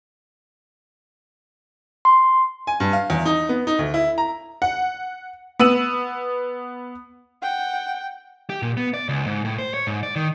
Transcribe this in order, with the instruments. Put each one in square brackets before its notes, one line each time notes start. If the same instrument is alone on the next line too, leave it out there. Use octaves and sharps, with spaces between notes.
[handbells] C6
[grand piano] G#5
G2
F5
E2
D#4
B3
D#4
D2
E4
A#5
[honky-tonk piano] F#5
B3 E6 D#7 F#7
[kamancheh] F#5 G5
[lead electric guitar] G4
A#2
B3
D5
C#2
G#2
A2
C5
C#5
G#2
D5
D#3